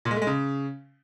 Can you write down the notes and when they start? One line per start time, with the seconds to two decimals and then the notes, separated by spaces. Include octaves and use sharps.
0.05 A#2
0.11 G#3
0.16 A3
0.22 G#3
0.27 C#3